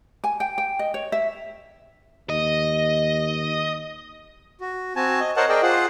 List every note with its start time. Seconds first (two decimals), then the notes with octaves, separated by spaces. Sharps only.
0.24 G#5
0.40 G5
0.58 G5
0.79 D#5
0.94 C#5
1.12 E5
2.30 D#2 D#5
4.61 F#4
4.96 C4 F#4 G#5 A5
5.21 D#5
5.37 A#4 C5 C#5 D#5 F#5 A5
5.49 G#4 A#4 D5 D#5 G5
5.63 F4 G#4 C5 F#5